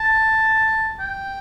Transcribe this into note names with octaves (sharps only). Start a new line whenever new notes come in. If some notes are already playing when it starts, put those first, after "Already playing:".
Already playing: A5
G5